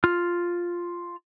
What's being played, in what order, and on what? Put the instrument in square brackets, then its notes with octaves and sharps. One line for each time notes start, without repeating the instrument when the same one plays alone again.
[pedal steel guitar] F4 F6